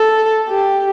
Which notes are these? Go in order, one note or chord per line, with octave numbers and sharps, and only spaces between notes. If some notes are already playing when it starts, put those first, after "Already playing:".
Already playing: A4
G4